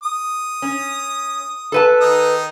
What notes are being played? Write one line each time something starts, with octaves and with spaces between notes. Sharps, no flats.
D#6
C#4
A4 B4 A5
D#3 D#4 D#6